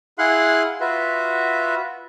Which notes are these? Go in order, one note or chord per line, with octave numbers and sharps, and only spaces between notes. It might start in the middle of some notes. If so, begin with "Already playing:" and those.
E4 G#4 F5 F#5 C6 F#6
F4 F#4 B4 E5